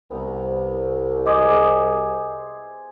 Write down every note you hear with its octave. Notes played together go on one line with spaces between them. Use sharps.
C2 B3 A#5
G#4 C5 D#5 E5 D6 D#6